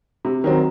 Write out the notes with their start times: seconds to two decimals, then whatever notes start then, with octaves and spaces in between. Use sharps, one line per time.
0.25 C3
0.44 D#3 F#3 C4